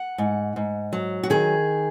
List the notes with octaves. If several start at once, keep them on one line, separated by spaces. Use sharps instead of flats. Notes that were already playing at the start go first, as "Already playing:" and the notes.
Already playing: F#5
G#2
G#2
F#3
F#4
D#3 G#4